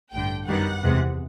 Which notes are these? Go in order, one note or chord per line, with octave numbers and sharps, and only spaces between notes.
A1 G2 D3 G5
F#2 D#3 G3 B3 F#5
E2 C3 E3 G#3